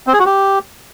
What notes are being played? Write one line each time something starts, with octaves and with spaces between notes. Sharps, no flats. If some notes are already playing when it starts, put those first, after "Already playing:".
C4
G#4
F#4
G4